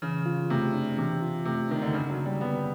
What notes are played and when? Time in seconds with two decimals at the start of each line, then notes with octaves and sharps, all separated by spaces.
0.02 C#3 E3
0.26 F4
0.50 C3 A3
0.74 D4
0.98 C3 E3
1.22 F4
1.45 C3 A3
1.69 D#3 D4
1.82 D3
1.93 G2 C#3
2.10 F#3
2.17 A#3
2.26 G3
2.41 D3 B3